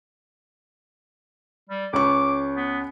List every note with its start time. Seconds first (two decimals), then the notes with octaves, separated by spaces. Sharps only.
1.69 G3
1.93 C#2 C#4 C#6 D6
2.57 B3